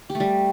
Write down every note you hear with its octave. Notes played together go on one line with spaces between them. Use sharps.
G4
A3
G3